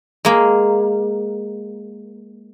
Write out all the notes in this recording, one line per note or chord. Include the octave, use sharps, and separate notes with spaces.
G#3 A#3